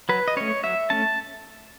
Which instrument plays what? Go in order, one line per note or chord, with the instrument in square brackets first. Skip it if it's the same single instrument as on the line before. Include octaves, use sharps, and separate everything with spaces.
[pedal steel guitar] F#3 B4
D#5
A3 C#4 C#5
F#3 E5
A3 C#4 A5